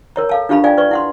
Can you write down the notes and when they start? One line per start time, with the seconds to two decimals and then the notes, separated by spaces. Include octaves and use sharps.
0.16 A#4 C#5 A#5
0.29 A4 F5 A5
0.49 D4 F4 G4 F5 A5 B5
0.64 F4 D5 F5 G5 G#5
0.77 B4 D5 C#6
0.91 E4 F#5 C6